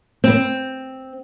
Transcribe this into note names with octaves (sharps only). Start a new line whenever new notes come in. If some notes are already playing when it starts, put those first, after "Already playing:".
C4